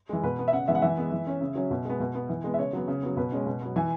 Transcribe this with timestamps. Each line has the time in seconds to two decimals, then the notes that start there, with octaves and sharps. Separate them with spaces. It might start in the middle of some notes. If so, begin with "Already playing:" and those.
0.09 E3 G#3
0.23 B2 B4
0.39 B3
0.48 E5
0.53 C#3 F#5
0.68 E3 G#3 B3 E5
0.75 F#5
0.82 E3 E5
0.97 G#3 B3
1.12 E3
1.27 C#4
1.41 C#3
1.55 F#3 C#4
1.71 B2
1.85 G#3 B3
2.00 B2
2.15 B3
2.29 E3
2.44 G#3 B3
2.54 E5
2.59 C#3 C#5
2.73 F#3 B3
2.88 C#3
3.02 F#3 B3
3.17 B2 B4
3.32 G#3 C#4
3.46 B2
3.61 F#3 B3
3.76 E3 G#5